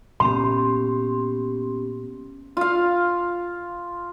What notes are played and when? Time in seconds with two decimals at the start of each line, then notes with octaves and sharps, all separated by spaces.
0.20 A#2 B3 C#4 G4 C6
2.57 F4 F5